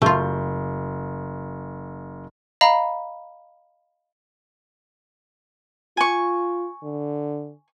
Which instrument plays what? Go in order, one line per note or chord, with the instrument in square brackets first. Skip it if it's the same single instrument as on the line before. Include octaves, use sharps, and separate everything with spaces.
[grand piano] F#1 A#5 G6 [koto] A3 F4
[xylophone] D#5 F5 A#5 B5
[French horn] F4 [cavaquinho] G#5 C#6
[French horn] D3